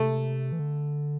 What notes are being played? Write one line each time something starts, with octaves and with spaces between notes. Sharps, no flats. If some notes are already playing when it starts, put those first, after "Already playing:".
Already playing: C3 A3
E3
D3